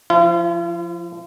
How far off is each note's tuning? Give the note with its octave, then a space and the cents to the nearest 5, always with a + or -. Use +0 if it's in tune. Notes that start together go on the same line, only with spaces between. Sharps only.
F3 +0 F4 -45